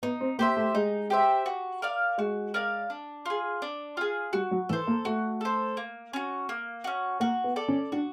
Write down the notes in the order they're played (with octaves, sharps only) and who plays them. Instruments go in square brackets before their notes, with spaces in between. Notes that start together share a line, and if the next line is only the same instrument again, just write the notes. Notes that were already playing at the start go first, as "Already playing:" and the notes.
[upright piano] B3 [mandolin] D#4
[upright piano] C4
[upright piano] A#3 [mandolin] G4 C5 E5
[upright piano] A3
[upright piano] G#3 [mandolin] D#4
[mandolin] G4 C5 E5
F#4
A#4 D5 F5
[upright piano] G#3 [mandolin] F#4
[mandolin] A#4 D5 F5
D4
F4 G#4
D4
F4 G#4
[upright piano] G3 [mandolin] F#4
[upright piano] F#3
[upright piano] E3 [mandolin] A4
[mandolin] C5
[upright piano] A#3
[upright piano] A3 [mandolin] F#4
[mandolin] A4 C5
A#3
C#4 F#4
A#3
C#4 F#4
[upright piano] A#3 [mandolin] F#4
[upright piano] B3
[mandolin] A4 D5
[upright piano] C#4
[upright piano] D4 [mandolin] F#4